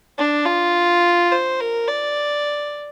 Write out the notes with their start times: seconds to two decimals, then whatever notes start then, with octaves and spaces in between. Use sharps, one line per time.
0.18 D4
0.45 F4
1.32 C5
1.60 A#4
1.88 D5